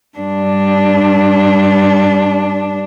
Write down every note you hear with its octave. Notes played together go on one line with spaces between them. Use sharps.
G2 D4